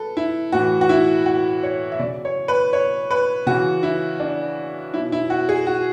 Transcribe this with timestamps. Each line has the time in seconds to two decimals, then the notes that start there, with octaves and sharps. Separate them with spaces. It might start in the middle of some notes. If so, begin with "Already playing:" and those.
Already playing: F#3 A4 B4
0.17 E4
0.52 A2 E3 F#4
0.81 F#4
0.89 E4
1.26 F#4
1.63 C#5
1.92 E5
1.99 C#3 F#3 D5
2.25 C#5
2.48 B4
2.73 C#5
3.11 B4
3.46 C#3 E3 F#4
3.83 E4
4.20 D4
4.94 B2 F#3 E4
5.12 E4
5.30 F#4
5.49 G#4
5.67 F#4